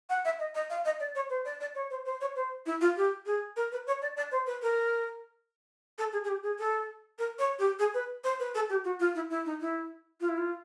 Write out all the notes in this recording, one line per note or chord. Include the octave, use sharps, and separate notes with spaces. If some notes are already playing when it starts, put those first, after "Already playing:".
F#5
E5
D#5
D#5
F5
D#5
D5
C#5
C5
D5
D5
C#5
C5
C5
C#5
C5
E4
F4
G4
G#4
A#4
B4
C#5
D5
D5
C5
B4
A#4
A4
G#4
G#4
G4
G#4
A4
A#4
C#5
G4
G#4
B4
C5
B4
A4
G4
F#4
F4
E4
E4
D#4
E4
F4
E4
F4